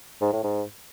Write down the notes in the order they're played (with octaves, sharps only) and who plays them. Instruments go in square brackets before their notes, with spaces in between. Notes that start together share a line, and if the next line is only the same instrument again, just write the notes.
[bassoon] G#2
A2
G#2